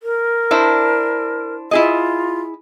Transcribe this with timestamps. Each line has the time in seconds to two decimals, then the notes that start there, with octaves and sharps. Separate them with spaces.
0.03 A#4
0.51 D4 E4 C5
1.71 E4 F4 G#4 D#5